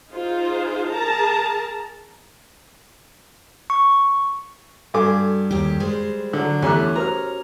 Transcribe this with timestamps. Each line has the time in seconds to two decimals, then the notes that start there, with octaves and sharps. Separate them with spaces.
0.11 D#4 F4 G#4 C5
0.91 G#4 A#4 A5 A#5
3.70 C#6
4.94 G2 F#4 A4 F5 G#5 D6
5.51 D#2 G4
5.80 G3 G#3 C5
6.33 D3 F#3
6.62 E2 A3 C#4 G4 A#5 D6 F#6
6.96 F#4 A#4 C5 A#5 F6